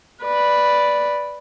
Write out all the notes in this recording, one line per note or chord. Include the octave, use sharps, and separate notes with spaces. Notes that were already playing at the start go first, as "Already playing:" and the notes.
B4 D5